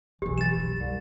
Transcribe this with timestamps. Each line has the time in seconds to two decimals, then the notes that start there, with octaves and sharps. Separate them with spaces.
0.22 F1 B1 E3 G4
0.38 A6 E7
0.59 F#2
0.77 C2